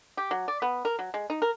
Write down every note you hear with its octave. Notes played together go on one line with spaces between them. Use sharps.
G4
F#3
D5
B3
A#4
F#3
G#3
D#4
A#4